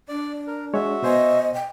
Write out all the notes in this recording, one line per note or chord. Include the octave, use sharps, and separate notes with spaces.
D4 D5
A#4
G#3 F#4 C#5 E5
B2 C5 D#5 G#5
G5